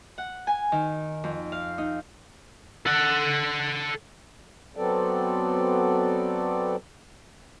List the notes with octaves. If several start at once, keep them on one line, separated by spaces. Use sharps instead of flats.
F#5
G#5
D#3
F2
F5
D#4
A4 F#5
F#3 B3 C4 A4 D5